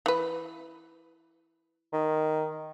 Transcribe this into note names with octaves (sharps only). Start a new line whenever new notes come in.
E3 B4
D#3